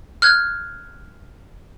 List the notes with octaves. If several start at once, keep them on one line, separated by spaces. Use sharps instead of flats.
F6 F#6 G#6